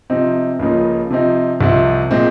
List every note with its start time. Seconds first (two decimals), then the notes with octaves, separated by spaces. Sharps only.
0.10 C3 F3 C4 D#4
0.59 C#2 C#3 F3 A#3 D#4
1.10 C3 F3 C4 D#4
1.61 C2 C3 F3 C4 D#4
2.11 A#2 G#3 C4 D#4